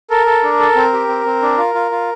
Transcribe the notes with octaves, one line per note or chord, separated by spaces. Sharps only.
A4 A#4
A4
D4
A4
C4
G4
C4
C4
D4
F4
F4
F4